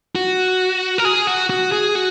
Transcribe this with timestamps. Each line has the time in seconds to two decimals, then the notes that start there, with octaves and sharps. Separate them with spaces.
0.15 F#4
0.98 A#4
1.05 G#4
1.27 F#4
1.50 F#4
1.72 G#4
1.95 F#4